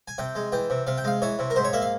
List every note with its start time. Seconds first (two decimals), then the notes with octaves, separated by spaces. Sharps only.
0.08 G#5
0.18 C3 G5
0.35 G#3
0.52 E3 G5
0.70 C3
0.87 C3 F5
0.98 G5
1.04 G#3 F5
1.22 E3 C#5
1.39 C3
1.50 A#4
1.56 G#2 C5
1.64 C#5
1.73 A#3 E5
1.82 F5